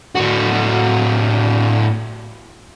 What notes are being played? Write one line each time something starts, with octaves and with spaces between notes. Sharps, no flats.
A2 F#4